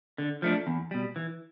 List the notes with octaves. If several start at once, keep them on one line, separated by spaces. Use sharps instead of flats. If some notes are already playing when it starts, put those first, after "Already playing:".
D3
F3 A3 D4
E2
B2 G3
E3